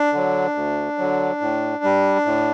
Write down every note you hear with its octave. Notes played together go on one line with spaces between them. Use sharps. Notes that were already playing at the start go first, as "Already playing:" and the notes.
Already playing: D4
D3 F#3
D2
D3 F#3
A2
G3
A2